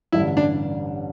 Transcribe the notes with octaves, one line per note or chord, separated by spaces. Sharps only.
A1 G2 D3 G3 E4
D4